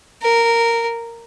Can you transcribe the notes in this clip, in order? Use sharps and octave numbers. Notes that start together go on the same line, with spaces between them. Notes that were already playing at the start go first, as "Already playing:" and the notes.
A#4